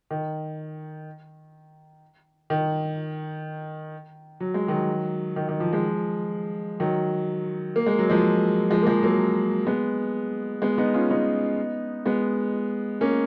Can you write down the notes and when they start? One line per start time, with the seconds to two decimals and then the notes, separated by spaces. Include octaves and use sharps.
0.11 D#3
2.50 D#3
4.40 F#3
4.54 G#3
4.68 D#3 F#3
5.36 D#3
5.49 D#3
5.60 F3
5.73 F3 G#3
6.80 D#3 F#3
7.76 A#3
7.86 G#3
7.99 F#3
8.10 F3 G#3
8.71 F3 G#3
8.82 A#3
8.87 F3 G#3
9.03 F#3 A#3
9.67 G#3 B3
10.62 G#3 B3
10.78 B3 D#4
10.94 C#4 F4
11.10 B3 D#4
12.06 G#3 B3
13.01 A#3 C#4